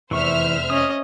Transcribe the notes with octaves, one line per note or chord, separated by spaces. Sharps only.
F1 E2 E3 C5 E5 C#6 F6
C#4 D#5 D#6